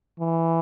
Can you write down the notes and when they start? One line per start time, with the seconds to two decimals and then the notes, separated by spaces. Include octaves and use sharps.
0.19 E3